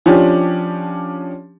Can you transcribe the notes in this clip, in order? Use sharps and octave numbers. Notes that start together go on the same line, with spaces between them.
F3 C#4 D4 G4